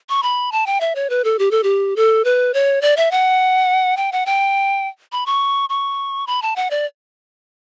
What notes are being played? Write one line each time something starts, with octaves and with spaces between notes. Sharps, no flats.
C#6
B5
A5
G5
E5
C#5
B4
A4
G4
A4
G4
A4
B4
C#5
D5
E5
F#5
G5
F#5
G5
B5
C#6
C#6
B5
A5
F#5
D5